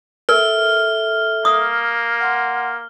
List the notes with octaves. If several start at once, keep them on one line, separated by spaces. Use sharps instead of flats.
A4 A#4 E5 F6
A#3 D#6
F#5 C6